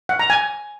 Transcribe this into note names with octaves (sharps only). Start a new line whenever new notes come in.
F#5
A#5
G#5